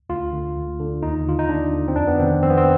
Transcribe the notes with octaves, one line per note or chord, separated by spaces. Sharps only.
D2 F4
D3
D2
D3
D#2 D#4
D3 F4
D#4
D#2 D4
D3
C4
F2 D4
B3
C3 D#3 C4
F2 C4
B3
C4